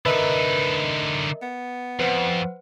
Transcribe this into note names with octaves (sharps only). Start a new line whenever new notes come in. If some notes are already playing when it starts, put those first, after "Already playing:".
D3 D#4 A#4 B4 D#5 E5
B3
F2 B4 C5 F#5